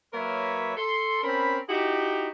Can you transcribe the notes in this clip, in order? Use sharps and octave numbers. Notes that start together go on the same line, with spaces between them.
F#3 A#3 A#4 B4 C#5 E5
A4 C6
C4 C#4 A#4 B5
D#4 E4 F#4 G4